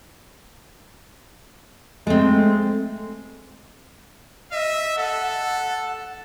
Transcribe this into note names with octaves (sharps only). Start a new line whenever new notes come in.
G#3 A3 C4
D#5 E5
A4 F#5